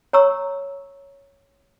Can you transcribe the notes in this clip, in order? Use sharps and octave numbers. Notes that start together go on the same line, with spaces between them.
C#5 A#5 C#6 E6